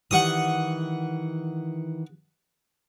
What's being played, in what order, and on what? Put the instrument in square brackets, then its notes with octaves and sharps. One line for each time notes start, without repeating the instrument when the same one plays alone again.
[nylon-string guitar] D#3 E3 G3 [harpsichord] F#5 C#6 D#6